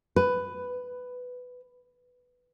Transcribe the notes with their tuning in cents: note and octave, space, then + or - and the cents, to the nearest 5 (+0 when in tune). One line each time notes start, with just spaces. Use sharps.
B4 +10